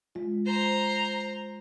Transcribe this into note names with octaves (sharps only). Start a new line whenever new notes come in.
G#3 F4
C5 A#5